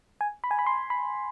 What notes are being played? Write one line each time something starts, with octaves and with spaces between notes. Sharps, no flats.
G#5
B5
G#5
B5
C6
B5